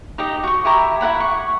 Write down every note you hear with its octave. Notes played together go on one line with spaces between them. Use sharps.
D#4 G4 D#5
F#4 C#6
E4 G4 E5 A#5
E4 F#4 F#5 B5
C#6